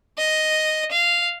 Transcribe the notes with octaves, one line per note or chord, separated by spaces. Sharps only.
D#5
F5